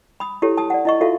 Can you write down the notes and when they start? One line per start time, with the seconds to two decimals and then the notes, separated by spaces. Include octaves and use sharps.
0.20 B5 D#6
0.42 E4 G4 A4 C#5
0.57 A5 D#6
0.70 D5 F#5
0.85 E4 D#5 C#6
1.00 F4 F#4 A4 E5 F5